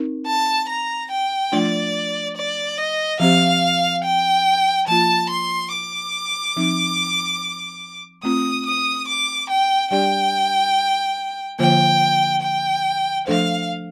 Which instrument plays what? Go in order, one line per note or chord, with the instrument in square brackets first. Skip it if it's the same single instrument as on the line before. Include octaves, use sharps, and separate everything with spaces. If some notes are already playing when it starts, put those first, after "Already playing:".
Already playing: [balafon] C4 D#4 A#4
[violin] A5
A#5
G5
[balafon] F3 A3 D4 F4 [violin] D5
[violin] D5
D#5
[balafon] F3 C4 G4 C5 [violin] F5
[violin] G5
[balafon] F3 A#3 F4 [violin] A5
[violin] C6
D6
[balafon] F3 C4 D#4
[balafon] A3 C4 F4 [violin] D#6
[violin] D#6
D6
G5
[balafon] G3 D4 G4 D5 [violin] G5
[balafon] D3 F3 A#3 F4 C5 [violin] G5
[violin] G5
[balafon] F3 A3 D4 A4 C5 [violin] F5